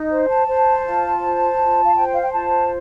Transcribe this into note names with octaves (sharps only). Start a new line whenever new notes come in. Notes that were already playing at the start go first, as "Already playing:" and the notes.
Already playing: D#4
C5
A5
C5
F4
C5
F4
F5
C5 G5
F5
G5
F4 A5